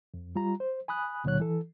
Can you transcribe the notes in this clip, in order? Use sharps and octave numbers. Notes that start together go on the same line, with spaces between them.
F2
G3 F4 A#5
C5
G#5 B5 D#6 F#6
C#2 A#2 D3 F#3 C#5 F#6
E3 A4